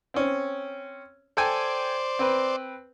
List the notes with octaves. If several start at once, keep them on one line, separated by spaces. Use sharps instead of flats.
C4 C#4
A4 C5 D5 G5 G#5
C4 B4